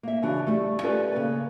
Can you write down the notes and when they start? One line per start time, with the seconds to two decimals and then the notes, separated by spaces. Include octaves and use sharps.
0.03 A#3 E5
0.22 C#3 E3 D4 F#4
0.47 G3 A3
0.83 C#4 F4 G4 A4 B4 D5
1.12 C#3 A#3 B4